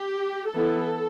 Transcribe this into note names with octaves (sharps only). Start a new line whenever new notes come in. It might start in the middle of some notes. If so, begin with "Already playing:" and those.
Already playing: G4
E3 B3 E4 A4